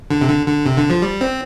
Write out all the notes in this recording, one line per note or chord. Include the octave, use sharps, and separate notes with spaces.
D3
C3
D3
D3
C3
D3
F3
G3
C4